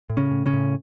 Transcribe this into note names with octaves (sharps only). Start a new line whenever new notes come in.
A2
C#3 C#4
A2
C#3 C#4
A2